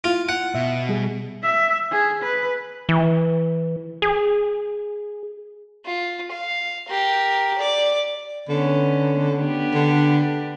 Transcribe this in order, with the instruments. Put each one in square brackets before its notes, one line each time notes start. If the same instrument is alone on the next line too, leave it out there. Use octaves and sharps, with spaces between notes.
[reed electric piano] E4 [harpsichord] F4
[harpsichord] F#5
[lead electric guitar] B2 [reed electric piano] E5
[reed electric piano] G3 G#4
[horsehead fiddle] E5
G#4
B4
[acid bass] E3
G#4
[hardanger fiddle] F4
F5
G4 A#4
D5 D6
[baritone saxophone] D3 [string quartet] B3 C#4
[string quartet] B3 D4 G4
[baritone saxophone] D3